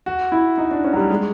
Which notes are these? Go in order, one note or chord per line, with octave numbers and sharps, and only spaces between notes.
F#4
E4
D#4
D4
C#4
F#3
G3
G#3